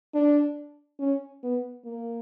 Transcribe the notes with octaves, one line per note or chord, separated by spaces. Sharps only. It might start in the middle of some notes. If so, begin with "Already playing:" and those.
D4
C#4
B3
A#3